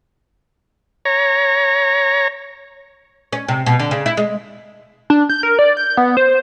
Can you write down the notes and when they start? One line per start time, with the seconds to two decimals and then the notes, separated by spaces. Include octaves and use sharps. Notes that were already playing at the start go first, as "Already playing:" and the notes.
1.05 C#5 A#5
3.33 C#4
3.48 C3
3.66 B2
3.79 D3
3.91 C#3
4.06 E4
4.17 G#3
5.10 D4
5.29 G6
5.43 A#4
5.59 D5
5.77 G6
5.97 B3
6.17 C5